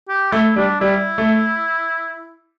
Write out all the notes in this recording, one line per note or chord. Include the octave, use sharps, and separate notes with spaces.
G4
A3 E4
G3 D4
G3 E4
A3